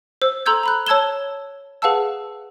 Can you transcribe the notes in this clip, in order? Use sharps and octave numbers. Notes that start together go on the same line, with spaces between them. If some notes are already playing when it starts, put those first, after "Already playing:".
C5 E6
A4 A#5 C6 E6 G6 G#6
A#5 B5 F#6
C#5 A5 E6 G#6 E7 G7
G#4 B4 F5 F#5 A5 E6